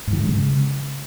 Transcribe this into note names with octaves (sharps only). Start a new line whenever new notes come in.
G#2
E3
G2
G#3
C#3